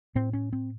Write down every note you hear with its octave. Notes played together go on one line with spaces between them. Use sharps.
A2 C4
C#4
C4